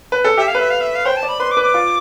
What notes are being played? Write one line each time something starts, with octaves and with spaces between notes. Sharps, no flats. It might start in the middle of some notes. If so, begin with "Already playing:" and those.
B4
A4
G4 E5
F5
B4 E5
F5
E5
F5
C5 G5
A5
D5
B5
B4 C6
D6
B4
D6
F4